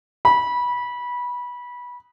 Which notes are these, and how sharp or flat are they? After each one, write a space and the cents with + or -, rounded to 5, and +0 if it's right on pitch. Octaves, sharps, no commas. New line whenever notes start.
B5 -20